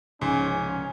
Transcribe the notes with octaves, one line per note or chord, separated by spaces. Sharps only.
C2 G#2 C#3 F3 G#3 C#4